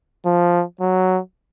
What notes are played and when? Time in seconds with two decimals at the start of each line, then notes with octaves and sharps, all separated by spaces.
0.26 F3
0.81 F#3